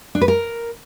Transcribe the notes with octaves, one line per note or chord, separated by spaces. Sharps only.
D4
B4
A#4